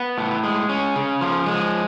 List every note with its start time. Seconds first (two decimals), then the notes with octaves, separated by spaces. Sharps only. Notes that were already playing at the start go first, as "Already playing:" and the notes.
Already playing: B3
0.18 A2
0.44 G#3
0.69 C#4
0.96 C#3
1.21 F3
1.46 G#3